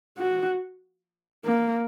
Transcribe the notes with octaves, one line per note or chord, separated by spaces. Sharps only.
F#4
A#3